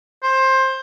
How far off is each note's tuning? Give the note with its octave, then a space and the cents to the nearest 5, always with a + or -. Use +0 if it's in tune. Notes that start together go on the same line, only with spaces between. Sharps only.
C5 +15